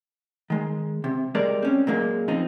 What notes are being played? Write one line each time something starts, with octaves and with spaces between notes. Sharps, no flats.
D#3 G#3
C3
G3 G#3 A#4 D5
C4 C#4
A#2 F#3 G#3 A#3
F#2 F3 C4 D#4